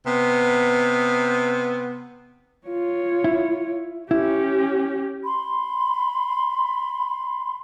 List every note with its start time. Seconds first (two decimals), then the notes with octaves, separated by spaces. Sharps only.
0.06 C3 B3
2.68 F4 C#5
3.24 E4
4.11 C#4 E4 G4
5.23 B5 C6